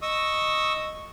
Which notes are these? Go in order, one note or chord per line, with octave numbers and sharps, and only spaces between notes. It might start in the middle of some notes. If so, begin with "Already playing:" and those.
D#5 C#6 D#6 E6